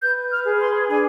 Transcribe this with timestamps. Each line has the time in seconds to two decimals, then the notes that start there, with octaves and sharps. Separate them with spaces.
0.03 B4 G6
0.31 F6
0.46 G#4
0.60 C6
0.89 D4 G#5